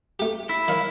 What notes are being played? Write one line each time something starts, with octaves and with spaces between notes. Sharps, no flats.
A3 G4
E4
D#3 C#5 F5